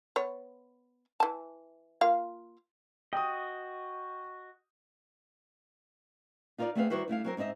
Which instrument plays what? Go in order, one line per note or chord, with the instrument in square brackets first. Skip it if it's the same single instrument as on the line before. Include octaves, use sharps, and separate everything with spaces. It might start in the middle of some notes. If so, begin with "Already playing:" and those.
[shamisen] B3 C#5
E3 A5
A#3 F4 F5
[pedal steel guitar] F#4 D#5 [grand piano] G5 D#6
[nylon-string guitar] D#4 F4 A#4 C#5 D5
A3 B3 C4 G#4 B4 F5
D#3 G3 E4 F#4 B4 C5
G2 A3 E4 F5
F#3 C4 A#4
G#2 C4 D#4 D#5 E5